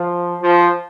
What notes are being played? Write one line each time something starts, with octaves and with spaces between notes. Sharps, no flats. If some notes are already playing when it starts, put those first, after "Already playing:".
Already playing: F3
F3